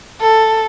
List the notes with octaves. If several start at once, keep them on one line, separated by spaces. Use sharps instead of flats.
A4